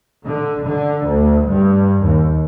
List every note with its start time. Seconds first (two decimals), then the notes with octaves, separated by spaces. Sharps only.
0.25 D3
0.66 D3
1.06 D2
1.48 G2
2.04 D#2